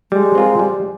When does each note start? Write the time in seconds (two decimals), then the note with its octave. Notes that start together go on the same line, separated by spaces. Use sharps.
0.12 G3 G#3
0.35 C4 F4 A#4
0.59 G3